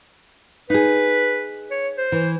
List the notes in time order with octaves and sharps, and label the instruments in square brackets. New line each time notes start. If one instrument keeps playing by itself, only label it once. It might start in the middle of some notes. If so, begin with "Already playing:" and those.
[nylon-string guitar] D#4 G#4 [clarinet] B4
[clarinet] C#5
C5
[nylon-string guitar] E3